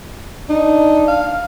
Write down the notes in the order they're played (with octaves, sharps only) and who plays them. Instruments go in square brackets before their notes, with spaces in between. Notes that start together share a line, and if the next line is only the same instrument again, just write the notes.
[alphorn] D4 [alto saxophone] D#4
[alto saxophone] F5